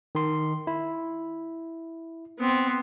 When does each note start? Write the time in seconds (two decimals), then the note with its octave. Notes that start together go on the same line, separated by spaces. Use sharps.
0.15 D#3 C6
0.67 E4
2.39 B3 C4